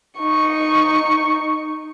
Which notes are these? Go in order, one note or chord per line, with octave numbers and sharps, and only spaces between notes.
D#4 C#6